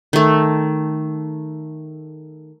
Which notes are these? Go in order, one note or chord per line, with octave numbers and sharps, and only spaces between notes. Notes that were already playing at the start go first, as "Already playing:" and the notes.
D#3 A3